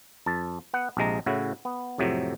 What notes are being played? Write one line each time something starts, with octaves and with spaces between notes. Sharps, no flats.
F2 A5
B3 F#5
A#1 C3 G#3 A#5
A2 C#3 E4 F#4
B3
F2 A2 C3 F#3